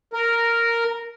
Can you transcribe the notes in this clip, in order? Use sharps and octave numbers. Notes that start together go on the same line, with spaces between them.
A#4